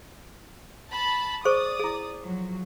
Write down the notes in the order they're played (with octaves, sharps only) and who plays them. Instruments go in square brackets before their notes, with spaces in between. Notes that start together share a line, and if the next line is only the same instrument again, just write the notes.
[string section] A5 B5
[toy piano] G#4 C5 C#6 [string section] D5 D#6
[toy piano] E4 G#4
[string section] F3 F#3